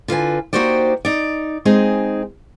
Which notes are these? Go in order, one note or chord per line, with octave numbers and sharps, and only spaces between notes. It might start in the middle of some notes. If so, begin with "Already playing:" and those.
D3 F4 B4 G#5
A#3 D#4 F#4 G4 C5 D5
D#4 D5
G#3 C4 D#4 G#4